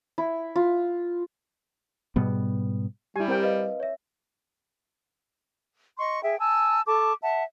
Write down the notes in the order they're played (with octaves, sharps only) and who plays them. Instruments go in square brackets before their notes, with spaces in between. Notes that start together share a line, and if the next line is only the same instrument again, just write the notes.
[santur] E4
F4
[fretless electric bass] G#2 B2 G3 B3
[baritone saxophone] G3 [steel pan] E4 G#5 [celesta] G4
[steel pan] C4 A#4 G5
[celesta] B4 D#5 F5
C#5 E5
[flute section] D#5 C6 C#6
G#4 E5 G5
G#5 A5 E6
A4 A5 C#6 D6
E5 F#5 A5